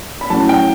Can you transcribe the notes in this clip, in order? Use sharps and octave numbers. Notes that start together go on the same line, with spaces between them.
B5
A2 F#3 C#4 A5
G5